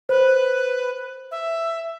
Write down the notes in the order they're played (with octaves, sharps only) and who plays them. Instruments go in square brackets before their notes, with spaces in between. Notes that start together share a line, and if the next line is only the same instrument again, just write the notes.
[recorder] B4 [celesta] C5
[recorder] E5